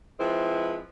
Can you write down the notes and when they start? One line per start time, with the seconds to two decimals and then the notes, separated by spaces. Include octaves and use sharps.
0.19 F3 G#3 C4 E4 B4